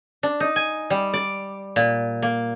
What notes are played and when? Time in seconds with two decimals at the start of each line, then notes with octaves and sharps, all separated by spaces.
0.23 D4
0.40 D#4
0.56 G#5
0.90 G3
1.14 D5
1.76 A#2
2.22 A#3